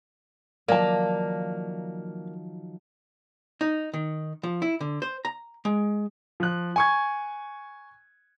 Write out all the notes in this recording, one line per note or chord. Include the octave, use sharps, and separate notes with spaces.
D#3 F3 F#3 A#3 D5 A5
D#4
D#3
F3
E4
D3
C5
A#5
G#3
F3 F#6
G#5 C#6 G#6